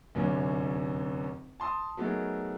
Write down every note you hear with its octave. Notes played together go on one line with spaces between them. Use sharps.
F1 F#2 D3 C#4
A5 C6 D#6
F#3 A3 B3 D#4 G#4 A#4